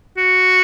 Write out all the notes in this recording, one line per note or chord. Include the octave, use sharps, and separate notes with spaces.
F#4